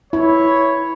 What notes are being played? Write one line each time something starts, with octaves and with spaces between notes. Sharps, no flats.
E4 C#5